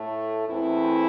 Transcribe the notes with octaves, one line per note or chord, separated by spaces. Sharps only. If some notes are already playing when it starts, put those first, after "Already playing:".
Already playing: A2 A3
E2 E3 A3 C4 E4